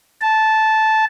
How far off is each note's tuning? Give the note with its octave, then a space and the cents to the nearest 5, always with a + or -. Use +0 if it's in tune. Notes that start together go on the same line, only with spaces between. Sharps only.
A5 -10